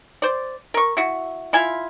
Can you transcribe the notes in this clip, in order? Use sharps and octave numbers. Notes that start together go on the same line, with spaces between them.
C5 D5
A#4 C#6
E4 F#4
E4 F4 G#5 B5